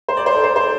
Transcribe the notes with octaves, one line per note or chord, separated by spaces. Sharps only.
C5
D5
C5
A4
C5
C5